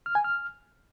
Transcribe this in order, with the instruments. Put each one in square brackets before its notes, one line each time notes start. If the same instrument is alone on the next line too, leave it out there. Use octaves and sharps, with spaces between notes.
[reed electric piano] F6
G#5
F6